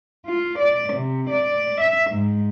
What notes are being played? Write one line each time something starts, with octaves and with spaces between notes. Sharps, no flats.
F4
D5
C3
D5
E5
G#2